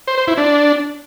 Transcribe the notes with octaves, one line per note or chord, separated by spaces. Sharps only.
C5
C5
E4
D4